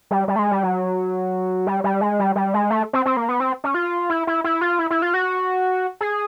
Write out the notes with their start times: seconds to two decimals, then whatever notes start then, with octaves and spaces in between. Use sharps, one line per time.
0.11 G3
0.28 G3
0.36 A3
0.39 G#3
0.51 G3
0.63 F#3
1.67 G3
1.84 G3
2.01 G#3
2.19 G3
2.36 G3
2.54 G#3
2.70 A3
2.93 C4
3.06 C4
3.17 A#3
3.29 B3
3.40 C4
3.64 C#4
3.74 F4
4.10 E4
4.27 E4
4.44 E4
4.61 F4
4.79 E4
4.90 E4
5.02 F4
5.14 F#4
6.01 G#4